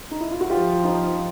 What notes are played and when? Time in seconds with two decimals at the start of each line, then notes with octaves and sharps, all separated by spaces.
0.11 D#4
0.20 E4
0.31 F4
0.41 F#4
0.50 F3 F4 G4
0.84 D#4 F4